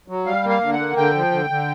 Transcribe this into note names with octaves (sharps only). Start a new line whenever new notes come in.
F#3
G3 F5
A#3
F5
D3
F#5
A#3
D3 G5
F3
D3
D3